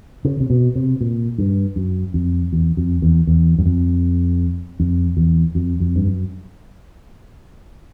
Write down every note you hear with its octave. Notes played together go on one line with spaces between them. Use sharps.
C#3
C3
B2
C3
A#2
G2
F#2
F2
E2
F2
E2
E2
F#2
F2
F2
E2
F2
F2
G2
F#2